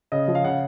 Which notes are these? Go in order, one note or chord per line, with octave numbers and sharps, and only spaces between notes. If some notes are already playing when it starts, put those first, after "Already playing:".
C#3 D#5
F3
F5
C#3 F#5